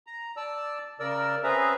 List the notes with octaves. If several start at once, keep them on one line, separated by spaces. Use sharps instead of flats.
A#5
D5 A5 E6
C#3 A#4 D5 E6
C4 C#4 G#4 B4 E5 A#5